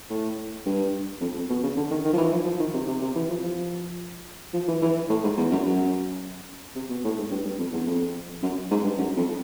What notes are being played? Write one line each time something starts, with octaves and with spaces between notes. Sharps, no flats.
A2
G2
F2
F2
B2
C#3
D3
D#3
D#3
F3
E3
F3
F3
D#3
C3
C3
C3
E3
F3
F3
F3
E3
E3
A2
G#2
E2
F#2
F#2
C3
B2
A2
G#2
G2
G2
F2
E2
F2
F#2
G#2
G2
F#2
F2